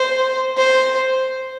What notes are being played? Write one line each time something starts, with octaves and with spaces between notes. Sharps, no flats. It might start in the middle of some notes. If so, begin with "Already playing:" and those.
Already playing: C5
C5